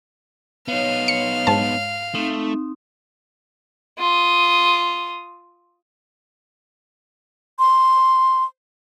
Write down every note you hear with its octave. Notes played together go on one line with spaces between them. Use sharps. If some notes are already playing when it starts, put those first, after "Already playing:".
B3 D#4 C#5 F5
C#7
G#2 A5
A3 C4 D#4
F4 D#6
C6